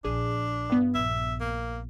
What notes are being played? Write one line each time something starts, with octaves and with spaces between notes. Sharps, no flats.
A#1 D4 G#4
G2 B3
A#1 E5
A#3